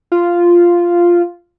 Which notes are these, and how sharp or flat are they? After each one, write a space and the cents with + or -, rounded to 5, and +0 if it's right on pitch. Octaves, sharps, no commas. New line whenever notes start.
F4 -5